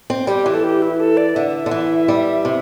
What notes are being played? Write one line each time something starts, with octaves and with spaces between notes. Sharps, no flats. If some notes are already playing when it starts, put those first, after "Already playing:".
C4
G3 G4
E3
A4
G4
E4
A4
D5
D3 E5
D3
E3
G3
C3